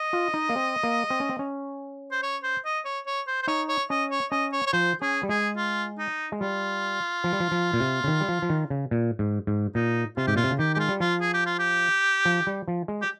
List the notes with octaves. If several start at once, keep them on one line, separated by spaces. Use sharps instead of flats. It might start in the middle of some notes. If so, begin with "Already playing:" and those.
Already playing: D#5
F4
D#4
A#3
C4
A#3
C4
C#4
C4
C#4
C5
C#5
C5
D#5
C#5
C#5
C5
C5
D#4 C#5
C#5
C#4 D#5
C#5
C#4 D#5
C#5
C#5
F3 C5
C#4 G#4
G3
G#3 G#4
F4
D#4
G#3
G3 F4
F3
G3
F3
F3
A#2
C3
C#3
D#3
G3
F3
F3
D#3
C#3
A#2
G#2
G#2
A#2 D#4
C3 F4
G#2 G4
A#2 F4
C3
C#3
D#3 G4
G#3 F4 G4
G3
F3 F4
G#4
G4
F4
G4
F3
G3
F3
G#3
G4